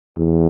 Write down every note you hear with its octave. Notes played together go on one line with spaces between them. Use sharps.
E2